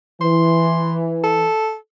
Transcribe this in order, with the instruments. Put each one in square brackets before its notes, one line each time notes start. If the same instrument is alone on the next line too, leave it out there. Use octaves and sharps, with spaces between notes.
[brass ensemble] E3 [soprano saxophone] C6
[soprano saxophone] A4